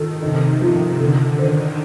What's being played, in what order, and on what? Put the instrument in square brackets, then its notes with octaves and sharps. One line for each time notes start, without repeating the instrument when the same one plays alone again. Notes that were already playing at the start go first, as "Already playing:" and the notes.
Already playing: [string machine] D#3 [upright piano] F4 A4
[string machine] C3 [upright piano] D#4
[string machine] C3 [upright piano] F3
[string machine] D3 [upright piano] A4
[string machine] D#3 [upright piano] C5